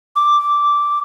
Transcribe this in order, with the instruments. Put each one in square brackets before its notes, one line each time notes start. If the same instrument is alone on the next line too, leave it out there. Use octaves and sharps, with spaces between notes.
[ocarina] D6